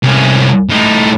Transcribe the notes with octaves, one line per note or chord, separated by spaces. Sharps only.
C2 C#4
A2 D#4